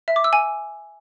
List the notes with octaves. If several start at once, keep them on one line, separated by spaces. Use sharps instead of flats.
E5
D6
E6
G#5